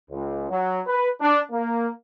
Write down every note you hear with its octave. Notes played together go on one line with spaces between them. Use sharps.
C#2
F#3
B4
D4
A#3